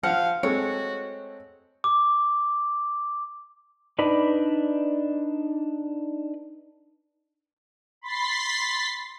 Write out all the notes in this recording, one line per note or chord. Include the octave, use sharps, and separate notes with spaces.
F3 F5 F#5 F6
G#3 A3 C4 F#4 C#5
D6
D4 D#4 B4 D5
B5 C6 A6 B6 C7